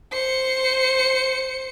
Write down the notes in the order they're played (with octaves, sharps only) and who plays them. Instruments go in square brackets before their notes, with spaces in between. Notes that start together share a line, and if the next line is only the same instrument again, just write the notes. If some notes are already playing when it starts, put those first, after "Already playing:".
[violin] C5 C#7